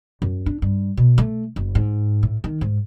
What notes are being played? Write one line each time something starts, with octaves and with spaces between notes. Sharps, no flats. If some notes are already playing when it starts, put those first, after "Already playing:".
F#2
D4
G2
B2
A3
F#1
G#2
A2
D#3
G#2